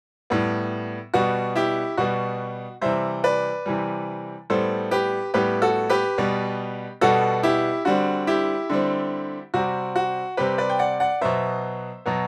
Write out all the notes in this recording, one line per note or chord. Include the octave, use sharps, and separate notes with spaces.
A2 G3 B3
B2 G3 B3 F#4
E4 G4
B2 G3 B3 F#4
C3 E3 G3 C5 E5
B4 D5
C3 E3 G3
A2 G3 B3 A4 C5
G4 B4
A2 G3 B3 G4 B4
F#4 A4
G4 B4
B2 G3 B3
B2 G3 B3 F#4 A4
E4 G4
D3 G3 C4 F#4
E4 G4
D3 G3 C4
C3 G3 C4 F#4
F#4
C3 G3 C4 G4 B4
B4 D5
G5
D5 F#5
D5 F#5
B2 F#3 B3 C5 E5
B2 F#3 B3